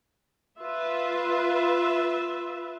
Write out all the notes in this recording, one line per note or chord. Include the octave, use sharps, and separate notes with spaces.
F4 B4 E5